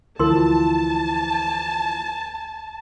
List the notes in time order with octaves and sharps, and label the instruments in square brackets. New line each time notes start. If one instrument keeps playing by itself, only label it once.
[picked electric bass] D2 [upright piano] E3 F3 [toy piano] A#4 C6 [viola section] A5